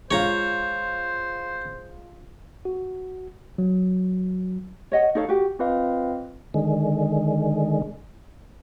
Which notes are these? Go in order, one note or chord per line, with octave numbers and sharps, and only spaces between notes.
G#3 F4 C5 C#5 F5 A#5
F#4
F#3
C#5 D#5 F#5
D#4 A4 C#5 F5
F#4 G4
C4 F4 B4 D#5 F5
D3 D#3 G#3